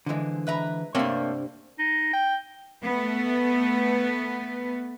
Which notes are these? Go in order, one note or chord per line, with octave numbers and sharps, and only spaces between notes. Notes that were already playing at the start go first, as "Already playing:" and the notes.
D3 E3 F3 G#3
B4 E5 A#5
G2 C3 A3 A#3 C4 C#5
D#4
G5
A3 B3